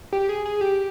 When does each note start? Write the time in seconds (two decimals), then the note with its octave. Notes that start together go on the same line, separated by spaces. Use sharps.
0.13 G4
0.29 G#4
0.45 G#4
0.61 G4